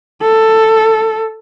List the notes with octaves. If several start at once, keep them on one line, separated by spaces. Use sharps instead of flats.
A4